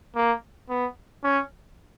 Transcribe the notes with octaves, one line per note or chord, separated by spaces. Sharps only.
A#3
B3
C#4